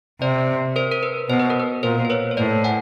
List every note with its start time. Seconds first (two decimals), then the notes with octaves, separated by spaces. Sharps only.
0.21 C3 C5 D5
0.76 A#4 C5
0.92 A#4
1.03 B4
1.29 B2 C5
1.39 B4
1.50 A#4
1.60 B4
1.83 A#2 A#4 C5
2.05 C5
2.10 B4 C#5
2.31 C#5
2.37 A2 C5 D5
2.64 F#5 G#5